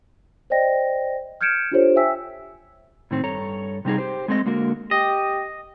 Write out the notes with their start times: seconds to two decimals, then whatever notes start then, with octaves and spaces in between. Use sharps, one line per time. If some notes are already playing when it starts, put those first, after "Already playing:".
0.50 C5 D5 D#5 G5 A#6
1.41 F6 G6 G#6 C#7 D7 E7
1.71 D4 F4 G4 A4 C5 C#5
1.96 E5 G5 G#5 E6 B6
3.11 A2 D#3 C4
3.24 G2 A4 C#5 A#5
3.85 C3 G3 D#4 G#4
3.98 G4 C5
4.28 G#3 A3 C4 D4 D#5
4.46 D3 G#3 A#3 F#4 A#4
4.91 G4 D#5